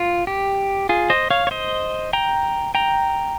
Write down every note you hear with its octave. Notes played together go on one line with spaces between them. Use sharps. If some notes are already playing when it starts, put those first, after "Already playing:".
Already playing: F4
G4
F4 G#4
C5 D#5
C#5 F5
C#5
C5 D#5
G5 A#5
G5 A#5